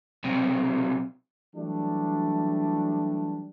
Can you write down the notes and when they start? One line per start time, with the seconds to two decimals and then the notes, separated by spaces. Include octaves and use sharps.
0.24 B1 C3
1.55 E3 F#3 G3 A3 D4